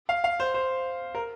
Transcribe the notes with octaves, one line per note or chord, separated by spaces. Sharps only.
F5
F5
C5
C5
A#4